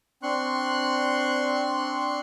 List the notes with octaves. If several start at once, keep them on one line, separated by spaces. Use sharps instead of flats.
C4 D4 C6 C#6 F#6